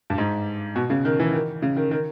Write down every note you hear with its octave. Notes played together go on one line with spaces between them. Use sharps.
G2
G#2
B2
C#3
D#3
E3
D#3
C#3
D#3
D#3